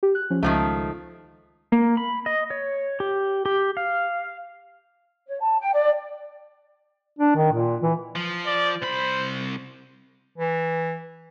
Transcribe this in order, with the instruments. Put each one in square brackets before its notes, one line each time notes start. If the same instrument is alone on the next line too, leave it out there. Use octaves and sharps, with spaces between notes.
[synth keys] G4
F#6
F3 C#4
[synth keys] C#2 [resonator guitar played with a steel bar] D#3 F3 A3
[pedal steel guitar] A#3
B5
D#5
C#5
G4
G4
F5
[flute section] C#5
A5
G5
D5
[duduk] D4
D#3
A#2
E3
[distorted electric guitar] F3
[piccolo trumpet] D5
[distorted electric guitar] C2 B5 [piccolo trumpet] C5
[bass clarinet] E3